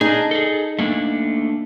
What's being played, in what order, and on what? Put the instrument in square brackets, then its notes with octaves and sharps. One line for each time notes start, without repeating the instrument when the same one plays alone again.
[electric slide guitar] D4 G#4 [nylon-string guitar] D#4
[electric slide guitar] G#4 A4
A3 A#3 D4